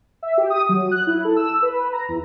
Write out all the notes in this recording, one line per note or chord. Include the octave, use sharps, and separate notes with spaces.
E5
G4
D#6
F#3
F#6
E4
A4
E6
B4
A#5
E2